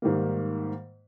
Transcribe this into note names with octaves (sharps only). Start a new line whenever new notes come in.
G#2 D#3 G3 A#3